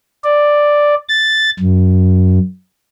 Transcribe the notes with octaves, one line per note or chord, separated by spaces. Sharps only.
D5
A6
F#2